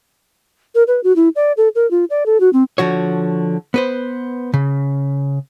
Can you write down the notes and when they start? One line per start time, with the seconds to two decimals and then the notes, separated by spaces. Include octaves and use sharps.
0.75 A#4
0.87 B4
1.04 F#4
1.16 E4
1.36 D5
1.57 A4
1.75 A#4
1.91 F4
2.10 D5
2.26 A4
2.40 F#4
2.53 C4
2.78 D3 F3 F#4 C#5
3.74 B3 B4 C5
4.54 C#3